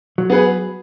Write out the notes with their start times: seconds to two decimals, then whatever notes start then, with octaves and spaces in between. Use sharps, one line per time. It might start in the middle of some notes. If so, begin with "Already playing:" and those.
0.18 F#3
0.30 B3 G#4 B4